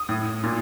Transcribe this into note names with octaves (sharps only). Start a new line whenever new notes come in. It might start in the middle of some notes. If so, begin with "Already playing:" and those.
Already playing: D#6
A2
A#2